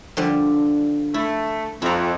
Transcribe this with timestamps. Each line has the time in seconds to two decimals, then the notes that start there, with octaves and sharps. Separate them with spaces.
0.17 D3 F3 G3
1.14 A3 E4
1.82 F2 E4 A#5